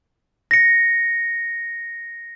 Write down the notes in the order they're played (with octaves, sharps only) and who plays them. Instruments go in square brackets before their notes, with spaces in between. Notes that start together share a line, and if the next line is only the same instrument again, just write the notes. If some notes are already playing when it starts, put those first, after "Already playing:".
[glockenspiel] A#6 C#7